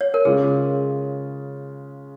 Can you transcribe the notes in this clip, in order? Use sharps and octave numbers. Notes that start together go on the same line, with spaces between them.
C#5
A#4
C#3 G#3 F4 G#4